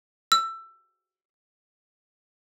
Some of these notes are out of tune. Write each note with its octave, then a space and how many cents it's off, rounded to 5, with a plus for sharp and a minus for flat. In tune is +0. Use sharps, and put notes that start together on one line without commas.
E6 +20